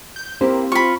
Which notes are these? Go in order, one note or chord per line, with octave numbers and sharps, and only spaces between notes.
G6
A#3 C4 E4 G4 C5
F4 B5 C#6